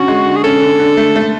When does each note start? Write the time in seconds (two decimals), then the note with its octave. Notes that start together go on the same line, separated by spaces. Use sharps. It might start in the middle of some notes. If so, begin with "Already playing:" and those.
Already playing: D3 C#4 F#4
0.08 G#3
0.26 D3
0.36 G#4
0.44 C#4 A4
0.62 D3
0.80 D3
0.97 A3
1.16 A3